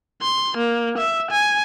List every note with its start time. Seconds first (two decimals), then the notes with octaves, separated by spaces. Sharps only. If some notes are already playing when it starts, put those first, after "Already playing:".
0.22 C6
0.57 A#3
0.98 E5
1.31 G#5